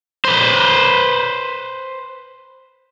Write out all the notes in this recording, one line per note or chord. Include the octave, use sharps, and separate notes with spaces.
B4 C5